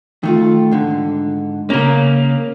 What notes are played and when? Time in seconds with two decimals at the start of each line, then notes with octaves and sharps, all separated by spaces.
0.23 D#3 A3 F4
0.71 G#2 D3
1.70 C#3 A#3 C#4 A#4